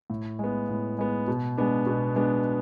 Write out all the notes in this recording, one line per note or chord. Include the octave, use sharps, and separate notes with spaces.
A2
G#3 B3
A2
G#3 B3
B2
G#3 B3 D4
B2
G#3 B3 D4